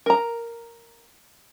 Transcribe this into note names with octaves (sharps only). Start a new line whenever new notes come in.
A#4 A#5